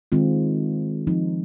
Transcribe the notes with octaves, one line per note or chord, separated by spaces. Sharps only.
D#3 G#3 C4 F4
F3 C4 D#4